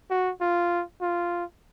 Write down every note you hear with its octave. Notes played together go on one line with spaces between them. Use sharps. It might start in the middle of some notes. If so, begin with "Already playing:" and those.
F#4
F4
F4